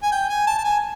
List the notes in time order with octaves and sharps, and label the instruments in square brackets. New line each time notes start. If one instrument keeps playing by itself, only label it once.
[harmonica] G#5
G5
G#5
A5
A5
G#5